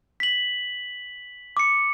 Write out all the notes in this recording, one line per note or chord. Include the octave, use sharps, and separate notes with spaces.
B6 F#7
D6 C#7